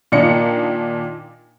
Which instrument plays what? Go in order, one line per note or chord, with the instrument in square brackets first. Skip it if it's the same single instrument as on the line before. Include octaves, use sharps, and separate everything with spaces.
[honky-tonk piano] A#2 D#3 A#3 D4 D#5 C#7